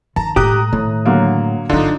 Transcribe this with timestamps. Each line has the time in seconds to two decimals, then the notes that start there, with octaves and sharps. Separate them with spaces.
0.16 D#3 A5 A#5
0.36 A2 G#3 G4 A#5 D#6 F#6
0.73 A2 D#3
1.05 D3 F#3 A#3
1.69 G1 D3 F#3 D4 D#4 F4